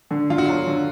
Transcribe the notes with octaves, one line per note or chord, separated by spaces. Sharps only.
D3
D3 F4
F#4
F#3 F4
D3